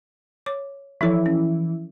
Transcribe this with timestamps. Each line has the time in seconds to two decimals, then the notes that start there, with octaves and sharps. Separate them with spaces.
0.46 C#5 D6
1.01 E3 F3 E4 A4 C#5
1.26 C#4